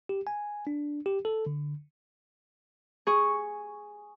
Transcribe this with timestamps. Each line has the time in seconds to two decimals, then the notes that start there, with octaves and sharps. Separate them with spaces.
0.09 G4
0.27 G#5
0.67 D4
1.06 G4
1.25 A4
1.46 D3
3.07 G#4 C#6